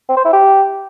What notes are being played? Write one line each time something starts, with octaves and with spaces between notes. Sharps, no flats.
C4
C5
E4
G4